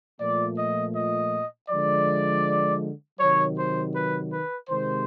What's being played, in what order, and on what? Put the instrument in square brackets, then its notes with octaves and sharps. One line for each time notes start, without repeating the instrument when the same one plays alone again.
[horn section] A#2 F3 A3 D5
D#5
D#5
D3 F3 G#3 D5
C3 D#3 F#3 C#5
C5
B4
B4
C3 D#3 G#3 C5